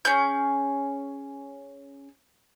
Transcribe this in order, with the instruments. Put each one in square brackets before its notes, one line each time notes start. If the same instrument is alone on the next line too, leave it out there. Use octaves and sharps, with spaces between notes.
[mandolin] C#4 G#4 G6